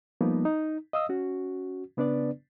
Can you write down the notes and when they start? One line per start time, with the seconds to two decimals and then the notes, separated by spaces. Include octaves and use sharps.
0.21 F3 G3 A#3 B3 D#4
0.45 D#4
0.93 D#5 F5 D#6 E6
1.09 C#4 F#4
1.97 C#3 B3 D4 B4 D5